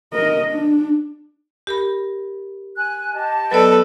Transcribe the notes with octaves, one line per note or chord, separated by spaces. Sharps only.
A#4 D#5
D4
G4 A#4 B5
G#5 F#6
G4 D#5 A5
F#3 B3 A4 B4 D5